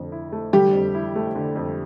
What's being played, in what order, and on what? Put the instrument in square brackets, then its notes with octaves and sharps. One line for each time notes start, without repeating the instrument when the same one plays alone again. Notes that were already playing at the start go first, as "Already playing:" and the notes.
Already playing: [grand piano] F2 D3 A3
E4
A3
[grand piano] D3 [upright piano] G3 G4
[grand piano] F2
E4
A3
D3
F2